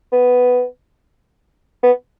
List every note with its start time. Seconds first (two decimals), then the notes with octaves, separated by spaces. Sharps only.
0.12 B3
1.83 B3